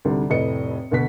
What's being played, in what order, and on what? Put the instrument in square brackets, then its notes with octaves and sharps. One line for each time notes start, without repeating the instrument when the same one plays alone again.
[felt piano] D2 G#2 C3 G3
F1 A2 B4 D#5 C#7
D2 B2 B6